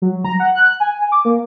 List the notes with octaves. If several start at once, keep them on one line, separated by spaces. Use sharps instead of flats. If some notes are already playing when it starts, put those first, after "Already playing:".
F#3
A#5
F#5
F#6
G#5
D6
A#3